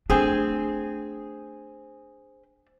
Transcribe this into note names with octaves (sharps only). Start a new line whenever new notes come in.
A3 C4 D4 G#4